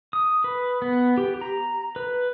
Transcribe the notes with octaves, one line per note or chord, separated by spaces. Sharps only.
D#6
B4
B3
G4
A#5
B4